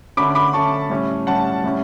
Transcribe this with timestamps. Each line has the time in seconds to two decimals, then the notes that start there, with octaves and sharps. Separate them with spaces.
0.17 D3 A3 C#4 B5 D6
0.35 B5 D6
0.53 D3 A3 C#4 A5 C#6
0.90 A2 G3 C#4
1.27 A2 G3 C#4 F#5 A5
1.64 A2 G3 C#4